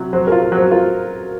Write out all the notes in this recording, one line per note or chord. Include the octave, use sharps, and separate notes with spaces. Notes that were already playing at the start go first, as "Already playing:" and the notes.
Already playing: C3 F#3
F#3 C5
F4 A#4
A#4
F#3 C5
F4 A#4